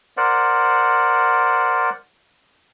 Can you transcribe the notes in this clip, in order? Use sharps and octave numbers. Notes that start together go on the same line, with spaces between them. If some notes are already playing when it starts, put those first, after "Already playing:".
A#4 C5 D5 F#5